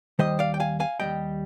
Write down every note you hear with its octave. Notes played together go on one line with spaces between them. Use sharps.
D#2 D#3 G3 C5 D#5
D5 F5
G5
F5 G#5
F5 G#5
D#2 D#3 G3 D#5 G5